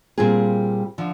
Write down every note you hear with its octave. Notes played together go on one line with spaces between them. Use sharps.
A#2 G3 C4 F4 G#4
D3 F3